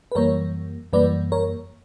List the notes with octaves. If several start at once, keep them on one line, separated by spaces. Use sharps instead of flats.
B4
F#2 E3 G3 A#3 A#4 C#5
F#2 E3 G3 A#3 B4 D5
A#4 C#5